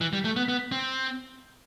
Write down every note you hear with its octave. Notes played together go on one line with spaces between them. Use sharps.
E3
G3
A3
B3
B3
C4